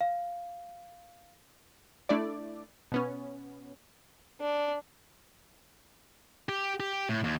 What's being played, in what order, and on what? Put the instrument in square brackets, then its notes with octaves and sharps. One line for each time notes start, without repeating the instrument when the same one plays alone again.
[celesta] F5
[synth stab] A3 D4 E4 D5
B2 B3 C#4
[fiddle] D4
[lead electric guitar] G4
G4
A2
D#2